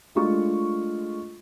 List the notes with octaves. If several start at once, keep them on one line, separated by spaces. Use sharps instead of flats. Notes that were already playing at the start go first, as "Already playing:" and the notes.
G#3 A3 D4 F4 C#6